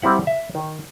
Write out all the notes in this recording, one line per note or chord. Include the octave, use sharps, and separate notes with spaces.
G3 C4 E4 F#5
E5
D#3